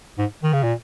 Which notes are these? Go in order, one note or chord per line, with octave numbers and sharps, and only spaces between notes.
G#2
D#3
C#3
A#2